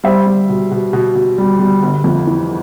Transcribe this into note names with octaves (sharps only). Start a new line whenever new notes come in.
G3 C5 E5
G3
B2
B2
B2
B2
G3
G3
G1
F2
E3